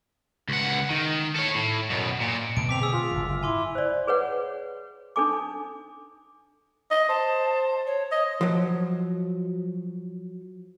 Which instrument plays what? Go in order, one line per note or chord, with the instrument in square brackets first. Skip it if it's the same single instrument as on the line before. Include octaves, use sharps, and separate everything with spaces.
[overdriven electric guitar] C#2 F#5
D#3
A4 C#5
A2
F#2 B2
A#2
[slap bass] B2 D3 A3 [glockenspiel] D7
[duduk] C4 [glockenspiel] D6 B6 F7
[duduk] G#4 [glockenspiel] E6 B6
[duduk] F4
[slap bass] F#1 G#2 D3
[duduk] E4 [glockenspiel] G#5 C6 D6
[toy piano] C5 D5
G#4 B4 C#5 F#5
D4 D#4 A4 G#5 D6
[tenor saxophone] D#5
[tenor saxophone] C5 [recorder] A5
[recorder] C#5
[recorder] C#5 [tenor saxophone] D#5
[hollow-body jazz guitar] F3 F#3